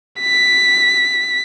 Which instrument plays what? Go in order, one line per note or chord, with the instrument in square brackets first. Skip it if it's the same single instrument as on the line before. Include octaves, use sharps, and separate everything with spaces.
[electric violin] B6